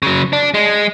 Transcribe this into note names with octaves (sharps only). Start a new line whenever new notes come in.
C#3 F#3
D4
G#3